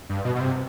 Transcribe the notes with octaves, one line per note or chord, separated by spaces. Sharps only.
G2
B2
B2
C3